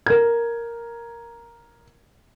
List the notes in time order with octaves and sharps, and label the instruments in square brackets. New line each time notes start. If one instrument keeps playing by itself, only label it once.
[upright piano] A#4 G#6